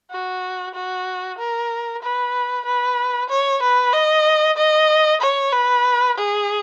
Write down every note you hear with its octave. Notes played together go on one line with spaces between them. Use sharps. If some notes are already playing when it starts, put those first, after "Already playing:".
F#4
F#4
A#4
B4
B4
C#5
B4
D#5
D#5
C#5
B4
G#4